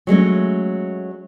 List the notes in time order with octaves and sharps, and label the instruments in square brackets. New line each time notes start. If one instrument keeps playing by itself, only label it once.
[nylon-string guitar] F#3 G#3 A3 C#4